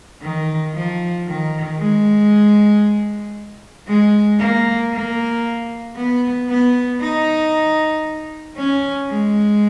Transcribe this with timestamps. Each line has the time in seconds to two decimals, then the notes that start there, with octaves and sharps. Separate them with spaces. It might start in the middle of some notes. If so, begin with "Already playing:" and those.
0.22 D#3
0.74 F3
1.26 D#3
1.78 G#3
3.87 G#3
4.39 A#3
4.92 A#3
5.97 B3
6.49 B3
7.00 D#4
8.57 C#4
9.10 G#3